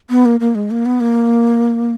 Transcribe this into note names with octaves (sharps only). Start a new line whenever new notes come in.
B3
A#3
A#3
G#3
A#3
B3
A#3